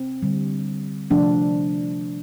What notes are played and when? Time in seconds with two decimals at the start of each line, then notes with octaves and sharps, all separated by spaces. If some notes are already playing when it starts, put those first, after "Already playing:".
Already playing: C4
0.22 D3 G3
1.10 C3 F3 A3 D4